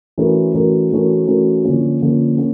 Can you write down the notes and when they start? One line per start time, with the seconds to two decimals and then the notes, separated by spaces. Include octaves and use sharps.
0.18 E3 A3 C#4 F#4 A#4
0.54 E3 A3 C#4 F#4 A#4
0.91 E3 A3 C#4 F#4 A#4
1.27 E3 A3 C#4 F#4 A#4
1.64 D3 F3 A#3 C#4
2.01 D3 F3 A#3 C#4
2.37 A#3 C#4